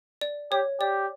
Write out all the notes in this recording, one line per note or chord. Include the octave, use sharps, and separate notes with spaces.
D5
G4 C#5
G4 D5